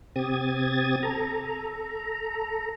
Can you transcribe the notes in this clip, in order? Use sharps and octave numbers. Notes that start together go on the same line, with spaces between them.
C3 C4 G4 D#6 G#6 A6
A4 A#5